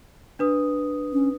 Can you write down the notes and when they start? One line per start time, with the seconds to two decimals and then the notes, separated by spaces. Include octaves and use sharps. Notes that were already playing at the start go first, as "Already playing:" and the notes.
0.39 D4 B4 D#6
1.13 C#4